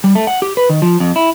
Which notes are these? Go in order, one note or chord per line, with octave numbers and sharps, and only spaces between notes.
G3
A3
F#5
G4
B4
D#3
F3
F2
E4